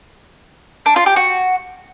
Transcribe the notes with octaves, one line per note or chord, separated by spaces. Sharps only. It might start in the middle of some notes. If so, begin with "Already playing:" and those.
D4
F4
G4
F#4